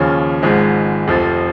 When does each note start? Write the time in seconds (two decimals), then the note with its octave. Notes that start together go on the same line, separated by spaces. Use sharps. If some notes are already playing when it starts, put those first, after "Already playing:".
Already playing: D#2 C#3 F3 C#4
0.42 G#1 G#2 F3 G#3
1.08 F1 F2 F3